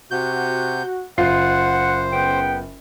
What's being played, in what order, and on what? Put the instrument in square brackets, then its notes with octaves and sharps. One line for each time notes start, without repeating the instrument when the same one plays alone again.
[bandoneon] C3 G6 [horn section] F#4
[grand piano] F#1 F4 C7 [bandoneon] C5 [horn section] F#5
[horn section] C#3 B3 G5